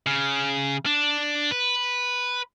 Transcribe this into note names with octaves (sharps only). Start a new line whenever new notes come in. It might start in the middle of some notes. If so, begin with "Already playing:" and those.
C#3
D4
B4